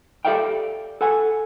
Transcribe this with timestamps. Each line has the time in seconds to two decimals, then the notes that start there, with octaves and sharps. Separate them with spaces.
0.25 G4 A4 D5 E5 F5 G5
1.01 A4 F#5 G#5